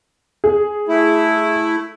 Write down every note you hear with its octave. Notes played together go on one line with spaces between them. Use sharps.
G#4
A3 E4